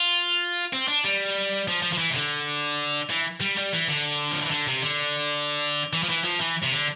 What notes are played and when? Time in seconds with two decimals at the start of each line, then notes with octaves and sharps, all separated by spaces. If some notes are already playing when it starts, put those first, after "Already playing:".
Already playing: F4
0.73 C4
0.88 D4
1.04 G3
1.68 F3
1.82 F3
1.93 F3
1.98 E3
2.10 C3
2.15 D3
3.10 E3
3.41 G3
3.57 G3
3.73 E3
3.88 D3
4.31 F3
4.41 E3
4.51 D3
4.67 C3
4.82 D3
5.93 E3
6.03 F3
6.09 E3
6.24 F3
6.40 E3
6.63 C3
6.72 D3